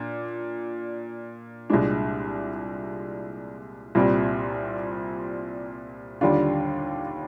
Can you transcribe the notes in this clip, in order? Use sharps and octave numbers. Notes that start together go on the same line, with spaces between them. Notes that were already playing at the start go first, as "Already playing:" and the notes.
Already playing: A#2 D4
C2 A#2 G#3 D4
C2 A#2 G3 C4
D#2 D3 G3 D4 F4